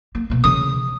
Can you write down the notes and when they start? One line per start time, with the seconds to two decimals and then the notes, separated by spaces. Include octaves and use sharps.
0.15 A#3
0.30 B2 A#3
0.44 C#3 E3 D#6